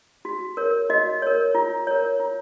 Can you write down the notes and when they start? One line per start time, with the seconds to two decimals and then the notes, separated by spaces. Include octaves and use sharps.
0.25 F#4
0.57 A#4 C#5
0.90 F#4 D#5
1.22 A#4 C#5
1.55 F4
1.87 A#4 C#5
2.20 F4